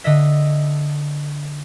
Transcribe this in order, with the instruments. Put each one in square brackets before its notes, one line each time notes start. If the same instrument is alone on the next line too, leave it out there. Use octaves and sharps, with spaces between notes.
[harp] D3 D#5 E5